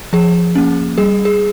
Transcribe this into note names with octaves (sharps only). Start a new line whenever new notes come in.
F3 G#4
A#3 C#4
G3 G#4
G#4